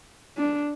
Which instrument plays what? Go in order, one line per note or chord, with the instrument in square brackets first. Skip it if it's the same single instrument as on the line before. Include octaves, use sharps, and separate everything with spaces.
[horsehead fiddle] D4